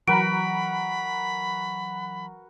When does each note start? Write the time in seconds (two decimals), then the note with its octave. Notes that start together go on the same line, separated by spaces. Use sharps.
0.08 E3 F#3 F#4 A#4 B4 A#5 B5 D7